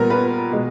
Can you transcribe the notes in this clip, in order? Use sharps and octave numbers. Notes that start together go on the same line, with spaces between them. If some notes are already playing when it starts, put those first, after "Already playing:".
Already playing: A#2 G3 B3 A#4
B4
B2 G#3